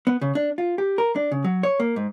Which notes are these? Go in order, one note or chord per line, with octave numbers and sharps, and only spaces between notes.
B3
C#3
D4
F4
G4
A#4
D4
C#3
F#3
C#5
A#3
G#2